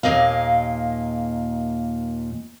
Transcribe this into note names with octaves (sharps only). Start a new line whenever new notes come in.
D#2 A#2 A#3 D#5 F5